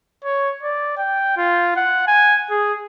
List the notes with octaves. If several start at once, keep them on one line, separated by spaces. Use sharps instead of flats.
C#5
D5
G5
F4
F#5
G#5
G#4